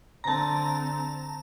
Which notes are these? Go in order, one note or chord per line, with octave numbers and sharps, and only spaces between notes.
D3 C4 A5 A#5